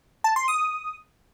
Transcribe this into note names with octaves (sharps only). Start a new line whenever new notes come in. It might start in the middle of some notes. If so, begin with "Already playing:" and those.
A5
C6
D#6